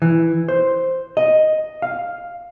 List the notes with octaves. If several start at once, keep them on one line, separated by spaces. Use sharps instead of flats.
E3
C5
D#5
F5